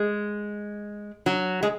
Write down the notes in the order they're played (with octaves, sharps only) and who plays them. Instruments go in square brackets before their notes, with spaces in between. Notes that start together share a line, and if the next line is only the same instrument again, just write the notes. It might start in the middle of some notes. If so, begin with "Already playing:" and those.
Already playing: [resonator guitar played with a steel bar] G#3
F#3
G#3